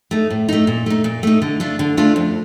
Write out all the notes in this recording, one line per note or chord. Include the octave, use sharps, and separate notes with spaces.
A3 D#4
A2
A3 D#4
A#2
A3 D#4
A#2
A3 D#4
D3
A3 D4 F4
D3
A3 D4 F4
F2